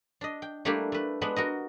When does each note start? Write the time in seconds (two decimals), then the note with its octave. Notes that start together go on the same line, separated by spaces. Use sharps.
0.21 D4 D#5
0.42 G5
0.65 G3 A3 A#3 D4 E4 G4
0.92 A3 B4
1.21 G#3 B3 D4 B4
1.36 F#4 A#4 D#5